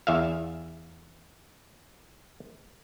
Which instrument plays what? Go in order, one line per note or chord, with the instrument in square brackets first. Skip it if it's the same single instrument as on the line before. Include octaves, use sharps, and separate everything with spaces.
[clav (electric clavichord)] E2 E5 F5